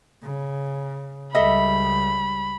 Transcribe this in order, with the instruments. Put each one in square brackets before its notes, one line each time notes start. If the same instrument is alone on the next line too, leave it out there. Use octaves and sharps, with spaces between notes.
[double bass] C#3
[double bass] C#2 G3 [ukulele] A4 D#5 E5 [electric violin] B5